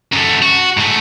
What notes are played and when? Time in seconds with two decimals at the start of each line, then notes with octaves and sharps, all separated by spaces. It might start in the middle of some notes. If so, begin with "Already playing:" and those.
0.13 F#2 A3
0.42 F#4
0.77 G#2 A3